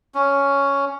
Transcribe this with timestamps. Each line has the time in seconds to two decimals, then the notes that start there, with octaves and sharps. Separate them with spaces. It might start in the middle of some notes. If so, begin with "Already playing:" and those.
0.14 C#4